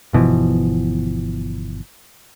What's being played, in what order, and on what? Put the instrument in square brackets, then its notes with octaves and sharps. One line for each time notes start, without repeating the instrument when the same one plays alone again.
[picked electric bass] G1 B2 E3 F3